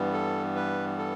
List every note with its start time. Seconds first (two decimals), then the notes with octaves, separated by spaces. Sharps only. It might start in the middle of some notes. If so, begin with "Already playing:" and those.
Already playing: G2 E3 G3 B3
0.13 A4
0.56 B4
0.98 A4